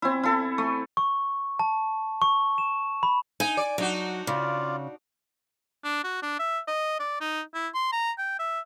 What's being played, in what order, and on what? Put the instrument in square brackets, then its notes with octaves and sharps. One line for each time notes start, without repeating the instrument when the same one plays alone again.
[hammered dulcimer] C4 E4
E4 A4
A3
[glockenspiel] C#6
A5
C#6
E7
B5
[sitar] D#4 [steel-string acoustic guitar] G#5
[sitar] D5
[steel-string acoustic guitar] F#3 [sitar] D4 D#4 F#4
[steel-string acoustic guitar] C#3 [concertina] F4 D5
[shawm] D4
F#4
D4
E5
D#5
D5
D#4
E4
C6
A#5
G5
E5